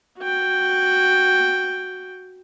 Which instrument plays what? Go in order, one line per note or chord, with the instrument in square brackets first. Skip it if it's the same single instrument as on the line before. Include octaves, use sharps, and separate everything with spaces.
[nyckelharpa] F#4 G5